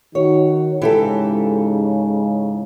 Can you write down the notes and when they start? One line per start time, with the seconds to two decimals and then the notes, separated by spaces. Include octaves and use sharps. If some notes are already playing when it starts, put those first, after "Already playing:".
0.15 D#3 F#4 C#5
0.82 G#2 C#3 E3 G4 A4